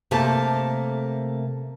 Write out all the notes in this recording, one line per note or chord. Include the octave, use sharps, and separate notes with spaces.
C3 A3 A#3 A4 A5